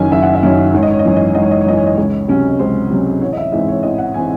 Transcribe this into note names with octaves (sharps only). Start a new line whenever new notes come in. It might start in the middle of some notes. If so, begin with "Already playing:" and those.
Already playing: F#1 F#2 D#3 F#3 C#4 G#5
F#1 E5
F#5
E5
F#2 D#3 F#3 C#4
G#1 C#5
D#5
C#5
D#5
F#2 E3 C#5
D#5
C#5
G#1 D#5
C#5
D#5
C#5
F#2 E3 D#5
C#5
D#5
C#2 C#5
C3 F#3 C#4
C#5
C#2 C5
C3 F#3 C#4
A1 C#5
D#5
E5
G#2 E3 C4 D#5
C#5
A1 D#5
F#5
E3 C4 G#5